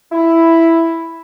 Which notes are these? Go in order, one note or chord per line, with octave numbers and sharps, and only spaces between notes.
E4